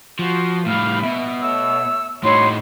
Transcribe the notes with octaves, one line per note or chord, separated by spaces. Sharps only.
F3 F#4 C6
A2 G3 F5 B5
B2 E5
A3 C#5 E6
A2 D#4 F#4 C#5 B5 C6